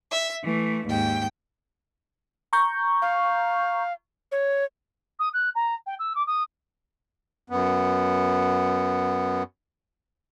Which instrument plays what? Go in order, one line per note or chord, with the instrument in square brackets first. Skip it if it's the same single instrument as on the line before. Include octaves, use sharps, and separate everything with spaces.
[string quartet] E5
E3 A3
D#2 G#2 G5
[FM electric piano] A#5 C#6 G6
[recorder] F5
C#5
[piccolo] D#6
F#6
A#5
G5
E6
D6
D#6
[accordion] F#2 B3